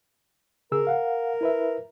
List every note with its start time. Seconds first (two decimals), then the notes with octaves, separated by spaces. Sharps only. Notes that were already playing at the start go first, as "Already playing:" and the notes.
0.72 C#3 G#4 A#4 E6
0.87 F5 F#5
1.41 E4 B4 E5